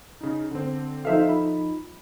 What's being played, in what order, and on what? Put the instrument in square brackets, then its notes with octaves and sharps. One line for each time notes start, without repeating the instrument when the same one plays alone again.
[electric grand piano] C#3 D#4
D3 C4
[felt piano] F3 D#4 A4 [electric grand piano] C5 E5 F5
[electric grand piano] B5